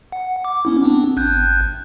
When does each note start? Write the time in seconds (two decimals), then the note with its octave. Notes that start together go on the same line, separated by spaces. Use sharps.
0.12 F#5
0.45 D6
0.65 B3 C#4 E4
0.82 B3 C4 D4
1.17 G#1 F#6 G6